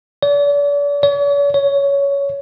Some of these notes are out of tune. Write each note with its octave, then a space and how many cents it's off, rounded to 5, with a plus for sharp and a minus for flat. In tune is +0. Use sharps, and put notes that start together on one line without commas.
D5 -40
C#5 +45
C#5 +15